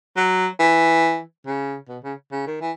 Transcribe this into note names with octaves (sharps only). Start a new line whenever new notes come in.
F#3
E3
C#3
B2
C#3
C#3
D#3
E3